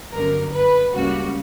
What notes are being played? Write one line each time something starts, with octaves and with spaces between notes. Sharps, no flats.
G1 F#2 D3 A#4
B4
C#2 C#3 G3 A#3 F#4